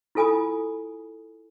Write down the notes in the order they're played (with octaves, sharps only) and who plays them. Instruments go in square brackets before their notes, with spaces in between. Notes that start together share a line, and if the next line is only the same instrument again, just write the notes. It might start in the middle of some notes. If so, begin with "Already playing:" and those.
[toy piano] E4 F4 A4 G#5 B5 D#6